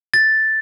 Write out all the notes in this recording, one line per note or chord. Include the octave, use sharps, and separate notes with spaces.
A6